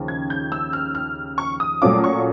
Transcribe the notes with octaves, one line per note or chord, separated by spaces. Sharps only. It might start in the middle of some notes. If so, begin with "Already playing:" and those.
Already playing: D#2 C#3 F3
G#6
G6
E6
F6
F6
C#6
D#6
A#2 F#3 A3 C#4 F4 D6
C#6